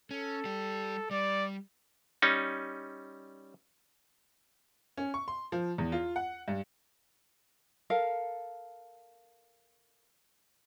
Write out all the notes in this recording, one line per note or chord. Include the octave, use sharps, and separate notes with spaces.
C#4 A4
G3 G4
G3 D5
G3 C#4 D#4
C#4
C#6
C6
F3
E2
F4
F#5
G2
A4 A#4 F5